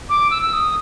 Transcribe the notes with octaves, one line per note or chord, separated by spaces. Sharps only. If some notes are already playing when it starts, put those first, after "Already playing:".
D6
E6
E6
D#6